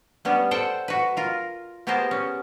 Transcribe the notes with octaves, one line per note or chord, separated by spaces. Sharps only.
G3 B3 C#4 D4
A4 C5 F#5 G5 A5
F#4 B4
F4 A#4
B3 G4 G#4 A#4 C5 A5
C#4